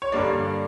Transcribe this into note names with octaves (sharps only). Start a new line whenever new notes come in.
C#5
G2 D3 G3 A#3 D4 D5